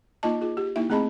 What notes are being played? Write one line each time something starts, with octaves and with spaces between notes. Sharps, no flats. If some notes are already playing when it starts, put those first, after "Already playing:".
A#3 D#4 F4 D#5 A5
F4 G#4
G4
A#3 D#4 E4 E5
A3 C4 G#4 D#5 A5 B5